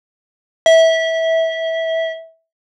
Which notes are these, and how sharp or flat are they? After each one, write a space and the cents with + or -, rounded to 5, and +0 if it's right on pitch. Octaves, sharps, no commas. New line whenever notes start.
E5 -20